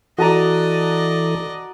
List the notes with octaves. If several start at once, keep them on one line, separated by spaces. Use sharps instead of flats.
E3 F#4 A4 D5 D#5 A5 A#5